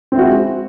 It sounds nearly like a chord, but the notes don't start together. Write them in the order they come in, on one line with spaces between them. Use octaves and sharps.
C4 E4 F#4 G#3